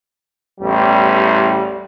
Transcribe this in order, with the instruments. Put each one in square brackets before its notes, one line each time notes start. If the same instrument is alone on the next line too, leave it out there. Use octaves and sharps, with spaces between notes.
[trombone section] A1 E2 G3